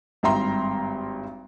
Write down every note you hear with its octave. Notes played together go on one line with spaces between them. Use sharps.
G#1 G2 E5 G5 A#5 C6